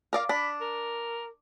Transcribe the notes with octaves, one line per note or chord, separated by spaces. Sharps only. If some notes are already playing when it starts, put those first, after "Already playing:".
A#4 D5 F5
D4 B5
A#4